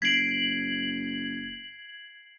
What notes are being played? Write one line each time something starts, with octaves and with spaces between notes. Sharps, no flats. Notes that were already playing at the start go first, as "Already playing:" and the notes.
F#1 G#6 B6 C7 D7 F#7